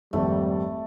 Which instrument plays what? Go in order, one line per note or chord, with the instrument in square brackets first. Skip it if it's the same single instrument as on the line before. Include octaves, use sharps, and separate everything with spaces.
[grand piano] G#1 F2 [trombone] G3 [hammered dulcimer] A3